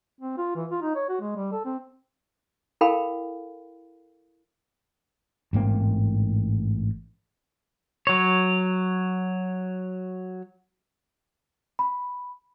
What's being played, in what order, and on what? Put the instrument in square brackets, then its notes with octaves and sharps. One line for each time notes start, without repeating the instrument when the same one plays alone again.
[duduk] C4
F4
E3
F4
D#4
C#5
F#4
G#3
G3
A4
C4
[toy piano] E4 A4 A#4 F5 G5 B5
[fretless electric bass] A1 G#2 A#3 C4
[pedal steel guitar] F#3 C#5
[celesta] B5